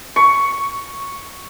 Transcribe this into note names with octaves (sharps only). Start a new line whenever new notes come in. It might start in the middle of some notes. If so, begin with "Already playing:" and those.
C#6